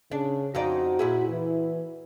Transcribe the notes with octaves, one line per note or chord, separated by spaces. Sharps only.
C#3 D4
F2 D#4 F#4 D5
A#2 E4 G#4
E3